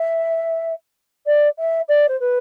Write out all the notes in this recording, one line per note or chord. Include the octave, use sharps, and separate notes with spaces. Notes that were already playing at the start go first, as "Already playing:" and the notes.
Already playing: E5
D5
E5
D5
C5
B4